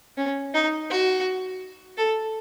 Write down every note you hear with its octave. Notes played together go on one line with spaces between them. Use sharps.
C#4
D#4
F#4
A4